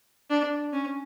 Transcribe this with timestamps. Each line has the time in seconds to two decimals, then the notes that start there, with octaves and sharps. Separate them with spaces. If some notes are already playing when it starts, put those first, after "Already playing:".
0.30 D4
0.73 C#4